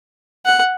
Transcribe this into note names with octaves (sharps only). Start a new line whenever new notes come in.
F#5